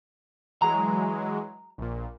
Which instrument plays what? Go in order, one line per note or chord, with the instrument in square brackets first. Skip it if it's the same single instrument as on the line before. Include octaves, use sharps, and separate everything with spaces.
[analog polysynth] E3 F#3 G#3 [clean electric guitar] A#5
[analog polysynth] A#1 A#2